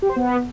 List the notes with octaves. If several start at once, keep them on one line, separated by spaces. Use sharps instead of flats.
G4
C5
B3